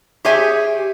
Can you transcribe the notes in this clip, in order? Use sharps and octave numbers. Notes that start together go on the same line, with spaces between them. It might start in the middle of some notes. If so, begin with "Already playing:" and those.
G4 G#4 C#5 E5 G#5